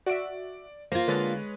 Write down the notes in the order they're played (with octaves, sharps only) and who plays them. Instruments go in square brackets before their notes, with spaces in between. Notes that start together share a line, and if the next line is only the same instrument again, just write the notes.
[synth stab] F#4 E5 [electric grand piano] D5 D7
[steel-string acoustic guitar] A#3 F4 [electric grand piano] C5 [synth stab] G#6 A#6
[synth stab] D3 A6 [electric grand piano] G#3 B4 C#5